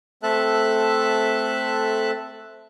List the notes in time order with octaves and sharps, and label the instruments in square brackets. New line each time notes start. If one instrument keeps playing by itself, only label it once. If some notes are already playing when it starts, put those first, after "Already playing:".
[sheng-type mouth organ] A3 C4 A4 E5 A5 F#6